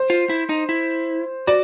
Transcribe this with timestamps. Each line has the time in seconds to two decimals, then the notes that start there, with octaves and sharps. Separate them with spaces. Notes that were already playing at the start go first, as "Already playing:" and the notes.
Already playing: C5
0.10 F4
0.29 E4
0.49 D#4
0.69 E4
1.47 F#4 D5